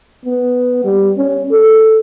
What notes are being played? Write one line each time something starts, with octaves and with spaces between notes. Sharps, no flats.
B3
G3
C#4
A4